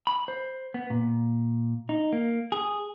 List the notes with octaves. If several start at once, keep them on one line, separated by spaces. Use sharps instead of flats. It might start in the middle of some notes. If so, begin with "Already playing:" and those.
B5
C5
B3
A#2
D#4
A#3
G#4